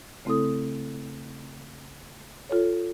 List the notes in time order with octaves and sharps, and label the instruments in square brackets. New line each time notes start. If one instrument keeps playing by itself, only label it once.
[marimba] C#3 A3 C4 E4 A4 D#6
F4 A4 C#5